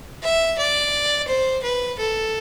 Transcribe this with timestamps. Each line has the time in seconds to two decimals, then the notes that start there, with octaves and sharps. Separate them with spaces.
0.23 E5
0.59 D5
1.28 C5
1.63 B4
1.99 A4